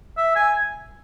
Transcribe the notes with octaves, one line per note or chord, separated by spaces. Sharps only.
E5
G#5